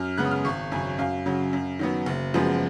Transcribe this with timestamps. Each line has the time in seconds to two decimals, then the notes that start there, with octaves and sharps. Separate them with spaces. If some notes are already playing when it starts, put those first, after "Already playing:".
Already playing: F#2 F6
0.18 C#3 G#3 B3 F#6
0.25 D#6
0.31 F6
0.44 G#1 C#6
0.72 F#2 C#3 G#5
0.99 F#2 F5
1.26 C#3 F#3
1.53 F#2
1.79 D#3 F#3 B3
2.06 F#1
2.34 F#2 F3 G#3 B3